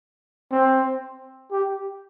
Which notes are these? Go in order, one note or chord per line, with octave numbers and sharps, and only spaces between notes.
C4
G4